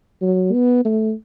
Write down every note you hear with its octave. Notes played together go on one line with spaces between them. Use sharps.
F#3
B3
A3